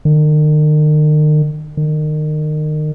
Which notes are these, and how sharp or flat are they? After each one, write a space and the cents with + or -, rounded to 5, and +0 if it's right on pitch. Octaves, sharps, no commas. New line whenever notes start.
D#3 -40
D#3 -30